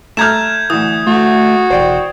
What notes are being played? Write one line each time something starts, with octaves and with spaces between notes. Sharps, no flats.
A3 A#5 F6 G6 G#6 E7
D2 E3 D#6
A3 F#4
E1 C5 D5 G5